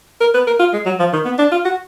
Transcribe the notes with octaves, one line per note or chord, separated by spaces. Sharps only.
A#4
B4
A#4
F4
G#3
F#3
F3
D#3
B3
D4
F4
F#4